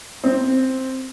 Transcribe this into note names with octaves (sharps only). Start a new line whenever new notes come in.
C4